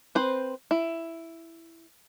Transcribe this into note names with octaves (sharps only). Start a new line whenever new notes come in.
C4 B4 C5
E4